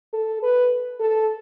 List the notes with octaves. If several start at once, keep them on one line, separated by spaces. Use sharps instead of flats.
A4
B4
A4